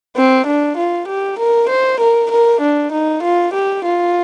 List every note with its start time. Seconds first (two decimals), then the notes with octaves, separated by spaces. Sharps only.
0.16 C4
0.47 D4
0.77 F4
1.08 G4
1.39 A#4
1.70 C5
2.00 A#4
2.31 A#4
2.61 D4
2.92 D#4
3.23 F4
3.54 G4
3.85 F4